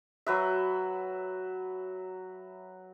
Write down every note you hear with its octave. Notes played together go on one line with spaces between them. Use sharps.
F#3 B4 E5